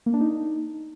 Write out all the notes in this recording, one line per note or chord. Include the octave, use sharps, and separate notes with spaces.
A#3
D4
D#4